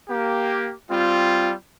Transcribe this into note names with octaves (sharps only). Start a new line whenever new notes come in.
A#3 G4
G3 C4 F4